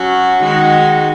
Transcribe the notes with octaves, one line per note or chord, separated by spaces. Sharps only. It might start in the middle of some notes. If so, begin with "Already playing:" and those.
Already playing: F#3 C#4 F#4
D#3 G#3 D#4 F#4